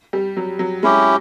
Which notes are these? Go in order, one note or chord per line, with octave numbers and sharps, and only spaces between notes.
G3
F#3
F#3
G#3 C#4 E4 G4